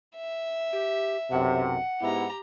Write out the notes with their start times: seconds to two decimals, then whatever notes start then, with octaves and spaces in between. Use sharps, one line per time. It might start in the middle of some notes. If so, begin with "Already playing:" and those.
0.16 E5
0.73 G4
1.31 B1 F#2 C3 F#5
2.01 G#2 B3 E4 G4 A#5